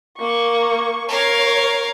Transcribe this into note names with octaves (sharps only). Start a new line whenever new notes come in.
A#3 C#6
A#4 C#5 F5